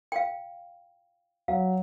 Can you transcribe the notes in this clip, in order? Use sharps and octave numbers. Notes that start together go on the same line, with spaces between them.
F5 G5
F#3 F5